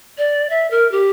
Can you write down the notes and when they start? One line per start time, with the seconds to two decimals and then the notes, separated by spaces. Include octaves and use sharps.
0.18 D5
0.50 E5
0.71 A#4
0.92 G4